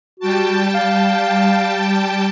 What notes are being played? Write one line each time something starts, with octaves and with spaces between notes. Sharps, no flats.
G3 F#4 G5 A5
F5